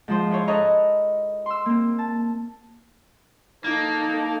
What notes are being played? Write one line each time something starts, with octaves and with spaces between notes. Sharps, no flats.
G#2 F3 C5
E4 C5 C#5
A4 B4 C#5 D#5 A#5
C6 E6
A#3 C4
A5
A#3 D#4 A4